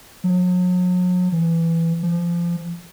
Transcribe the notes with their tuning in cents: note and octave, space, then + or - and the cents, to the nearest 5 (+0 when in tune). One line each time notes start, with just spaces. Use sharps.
F#3 -40
E3 +10
F3 -25